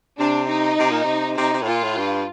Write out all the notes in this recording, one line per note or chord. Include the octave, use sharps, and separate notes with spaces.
C3 D4
D#4
C3
A#2
C3
C3 D#4
C3
A2
A#2 F4
A2
G2